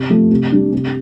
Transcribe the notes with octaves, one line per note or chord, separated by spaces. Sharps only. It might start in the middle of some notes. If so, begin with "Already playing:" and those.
Already playing: C3
F3 A3
C3
G3 D4
C3